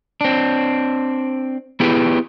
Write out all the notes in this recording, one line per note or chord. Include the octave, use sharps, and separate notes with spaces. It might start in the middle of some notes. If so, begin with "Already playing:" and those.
C4 D4
B3 E4 G4 G#4 B4